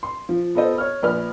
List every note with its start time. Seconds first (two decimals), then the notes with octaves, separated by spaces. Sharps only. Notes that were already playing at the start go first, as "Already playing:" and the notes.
0.03 C6
0.29 F3
0.55 B3 F4 A4 C5 D#5
0.78 C#5 F6
1.03 A#1 B4 F6